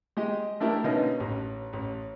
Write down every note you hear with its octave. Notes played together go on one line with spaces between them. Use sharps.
G#3 G4 D#5
A3 D4 E4 G4 A#4
B2 D3 A#3 B3 C#4 D#4
A1
A1